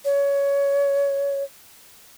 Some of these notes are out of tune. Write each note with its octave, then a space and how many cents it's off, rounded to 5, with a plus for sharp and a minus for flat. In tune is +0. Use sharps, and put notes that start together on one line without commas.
C#5 +15